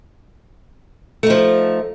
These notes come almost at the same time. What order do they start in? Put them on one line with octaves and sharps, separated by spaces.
A3 D#4 F3